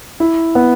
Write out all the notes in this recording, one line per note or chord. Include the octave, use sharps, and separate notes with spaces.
E4
B3